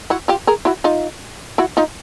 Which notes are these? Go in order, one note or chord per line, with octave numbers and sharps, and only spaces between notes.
E4 F#4
F4 G4
G#4 A#4
E4 F#4
D#4 F4
E4 F#4
D#4 F4